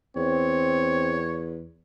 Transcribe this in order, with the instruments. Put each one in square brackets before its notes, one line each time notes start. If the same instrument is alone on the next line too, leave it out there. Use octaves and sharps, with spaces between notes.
[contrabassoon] E2 [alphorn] C4 [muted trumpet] C#5